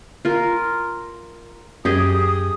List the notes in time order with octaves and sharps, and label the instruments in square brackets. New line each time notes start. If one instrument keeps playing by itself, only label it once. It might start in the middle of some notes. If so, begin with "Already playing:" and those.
[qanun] F4 A#4
[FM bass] F#2 [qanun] G4 G#4 D#5 [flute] D#6